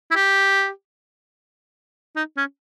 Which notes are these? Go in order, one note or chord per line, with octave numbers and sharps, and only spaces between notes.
E4
G4
D#4
C#4